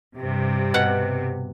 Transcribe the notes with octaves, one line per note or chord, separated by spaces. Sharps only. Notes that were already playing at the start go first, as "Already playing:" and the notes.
G2 C3
B2 F#5